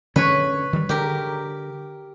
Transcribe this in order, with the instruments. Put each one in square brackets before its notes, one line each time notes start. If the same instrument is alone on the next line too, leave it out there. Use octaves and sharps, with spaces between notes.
[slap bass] D3 C#4 [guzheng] B4 C#5
[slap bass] D#3 G3
[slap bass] D3 [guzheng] G4 A#4